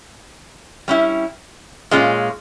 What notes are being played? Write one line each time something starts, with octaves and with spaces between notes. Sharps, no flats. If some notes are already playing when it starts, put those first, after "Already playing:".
G3 C#4 E4
A#2 G#3 C#4 F4